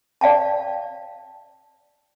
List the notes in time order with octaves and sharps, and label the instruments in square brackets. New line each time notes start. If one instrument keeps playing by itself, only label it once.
[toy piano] D5 F5 G5 A5